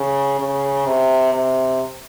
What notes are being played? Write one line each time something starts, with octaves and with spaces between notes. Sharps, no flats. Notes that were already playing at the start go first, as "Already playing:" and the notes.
Already playing: C#3
C#3
C3
C3